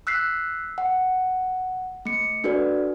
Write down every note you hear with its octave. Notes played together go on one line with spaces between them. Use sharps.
E6 F#6 B6 C7
F#5
A3 C#7
D4 F#4 A4 B4 D5